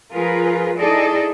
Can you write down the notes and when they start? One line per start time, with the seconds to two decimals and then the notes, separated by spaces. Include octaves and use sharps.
0.11 F3 F4 G#4 A#4 B4
0.76 D#4 E4 G#4 A4 D5 D#5